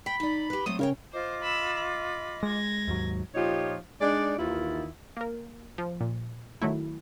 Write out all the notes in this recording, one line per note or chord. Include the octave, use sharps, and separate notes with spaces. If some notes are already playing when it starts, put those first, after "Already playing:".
G5 B5
D#4 D5
G4 B4
F#3 A3 C4 D#6
C#3 A#4 C#5 G5
F4 C5 D#5 D6
B5 E6
B5
G#3 G#6 A#6
D#2 G#2 F#3
A#2 F3 D#4 F4 G4 C#5
G#3 D4 D#4 D5
D#2 D#3 E3 E4 F4
A#3 A#4
F3
A#2
D#3 F#3 A3 E4